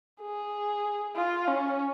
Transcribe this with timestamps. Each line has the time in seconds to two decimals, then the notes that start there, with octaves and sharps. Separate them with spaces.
0.22 G#4
1.16 F4
1.47 C#4